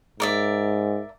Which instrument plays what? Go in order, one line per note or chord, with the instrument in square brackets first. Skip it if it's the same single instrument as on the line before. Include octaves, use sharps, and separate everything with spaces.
[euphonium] G#2 [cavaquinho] A#4 D5 E5